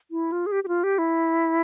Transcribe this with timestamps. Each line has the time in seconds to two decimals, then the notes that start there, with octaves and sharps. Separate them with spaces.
0.11 E4
0.32 F4
0.46 G#4
0.52 G4
0.64 G4
0.68 F4
0.84 G4
0.98 E4